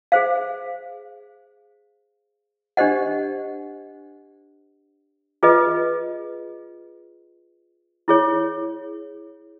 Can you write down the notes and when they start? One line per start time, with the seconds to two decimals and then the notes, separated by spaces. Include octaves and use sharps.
0.12 G#4 C5 F5
2.77 D4 G4 C5 D#5 F#5
5.43 F4 G#4 B4 D#5
8.08 E4 G#4 C#5